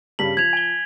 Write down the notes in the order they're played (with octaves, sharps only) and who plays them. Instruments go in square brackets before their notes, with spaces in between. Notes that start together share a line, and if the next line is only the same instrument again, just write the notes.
[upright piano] G2 C#3 G3 [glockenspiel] B6 F#7
[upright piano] F3 [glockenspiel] G#6 F7
[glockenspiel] G#5 G7